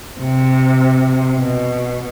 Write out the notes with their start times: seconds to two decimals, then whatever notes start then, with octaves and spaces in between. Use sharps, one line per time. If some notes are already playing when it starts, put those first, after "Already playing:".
0.20 C3
1.35 B2